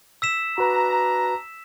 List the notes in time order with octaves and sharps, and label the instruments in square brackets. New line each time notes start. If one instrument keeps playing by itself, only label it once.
[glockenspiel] E6 B6 E7
[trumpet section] D4 A#5 [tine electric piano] F#4 B4